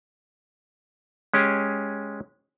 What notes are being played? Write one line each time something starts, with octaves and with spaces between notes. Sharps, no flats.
G#3 C#4 G4 G#4